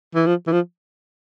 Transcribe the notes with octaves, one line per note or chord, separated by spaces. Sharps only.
E3
F3
E3
F3